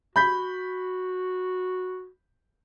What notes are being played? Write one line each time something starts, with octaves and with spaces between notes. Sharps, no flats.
F#4 B5 G6 B6